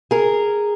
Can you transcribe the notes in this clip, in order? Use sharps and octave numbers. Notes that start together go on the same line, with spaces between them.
G#4 A#4